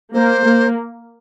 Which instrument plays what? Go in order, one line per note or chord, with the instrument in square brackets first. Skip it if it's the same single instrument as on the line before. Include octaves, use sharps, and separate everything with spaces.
[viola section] A#3 [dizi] C5
[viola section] A#3